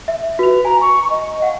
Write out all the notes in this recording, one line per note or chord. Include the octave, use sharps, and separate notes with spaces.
E5
F#4 B4 F7
G#5 A#5
C#6
D#5
F5 F#5